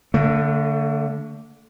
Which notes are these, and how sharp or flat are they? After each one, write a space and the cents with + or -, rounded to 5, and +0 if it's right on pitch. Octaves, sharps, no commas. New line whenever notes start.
D3 -15 A3 +30